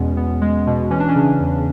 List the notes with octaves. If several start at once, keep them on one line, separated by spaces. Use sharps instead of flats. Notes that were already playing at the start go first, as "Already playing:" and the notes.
Already playing: E2 B2 G#3 B3 C#4
B3
G#3
B2
E3 C#4
D4
C#4
C#3
E2